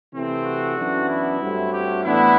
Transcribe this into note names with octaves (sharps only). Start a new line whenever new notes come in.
C3 E3 A3 C4
F#4
F#2 E3 B3 D4
E4
G2 F#3 A3 C4
G4
A2 E3 B3 D4 E4